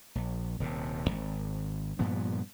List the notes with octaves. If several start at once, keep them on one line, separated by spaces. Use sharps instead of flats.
A#1
D#1 C3
G#1
G2 A#2 F3 B3